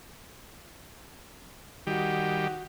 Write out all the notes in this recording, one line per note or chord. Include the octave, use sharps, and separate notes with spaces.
D#3 G3 F#4 G4